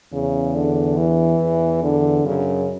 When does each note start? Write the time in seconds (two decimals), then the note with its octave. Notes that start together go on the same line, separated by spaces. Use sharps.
0.12 E2 C#3
0.55 D3
0.98 E3
1.40 E2
1.83 D3
2.24 F#2 C#3